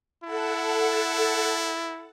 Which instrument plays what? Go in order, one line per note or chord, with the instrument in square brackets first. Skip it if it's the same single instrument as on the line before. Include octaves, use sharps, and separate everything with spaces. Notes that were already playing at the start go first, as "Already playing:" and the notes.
[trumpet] E4 [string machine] A4 F#5 A5